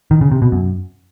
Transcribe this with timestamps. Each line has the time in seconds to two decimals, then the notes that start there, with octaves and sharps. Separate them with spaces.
0.11 D#3
0.21 C#3
0.32 C3
0.42 B2
0.52 F#2